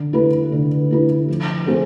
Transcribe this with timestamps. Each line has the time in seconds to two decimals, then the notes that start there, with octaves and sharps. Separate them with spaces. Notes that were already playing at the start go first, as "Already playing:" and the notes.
Already playing: D3
0.13 A3 E4 B4
0.52 D3
0.91 A3 E4 B4
1.28 F3
1.66 A3 C4 G#4 C5